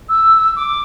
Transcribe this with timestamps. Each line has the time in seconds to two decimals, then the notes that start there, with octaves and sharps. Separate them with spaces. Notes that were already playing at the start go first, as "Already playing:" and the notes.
0.09 E6
0.56 D6